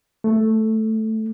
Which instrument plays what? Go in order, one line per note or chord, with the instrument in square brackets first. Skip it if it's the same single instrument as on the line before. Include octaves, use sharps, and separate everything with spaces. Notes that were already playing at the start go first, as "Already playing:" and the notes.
[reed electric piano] A3